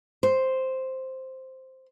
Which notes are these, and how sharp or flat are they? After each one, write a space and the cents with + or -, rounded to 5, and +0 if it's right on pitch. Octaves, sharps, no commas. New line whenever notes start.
C5 +0